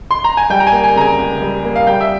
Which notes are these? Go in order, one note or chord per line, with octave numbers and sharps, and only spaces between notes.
C6
A#5
G#5
G3 G5
A#5
G#5
A#3
G#5
C#3 G#5 A#5
C#2
G3
A#3
F5
G3 G5
E5